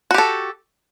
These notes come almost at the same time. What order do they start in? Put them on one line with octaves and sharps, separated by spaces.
F#4 G4 A4